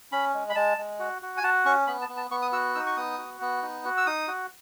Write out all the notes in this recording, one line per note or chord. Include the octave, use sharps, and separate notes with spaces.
C#4 B5
G#3
B5
G#3 A5
G#3
F#4
F#4
G#5
F#4 A5
C#4 C#6
B3 B5
A5
B3
A5
B3 C#6
D#6
F#4 E6
D#4 E6
C#6
B3 D#6
F#4
B3
D#4
F#4
E6
D#4 D#6
F#4